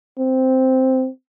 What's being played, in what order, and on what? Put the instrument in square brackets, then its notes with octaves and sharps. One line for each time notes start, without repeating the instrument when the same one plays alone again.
[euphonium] C4